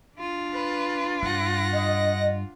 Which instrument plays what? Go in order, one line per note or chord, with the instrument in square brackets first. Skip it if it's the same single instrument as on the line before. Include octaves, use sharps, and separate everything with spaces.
[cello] D4 F4
[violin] B4
[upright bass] G2 [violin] F#5 A#6
[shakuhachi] D#5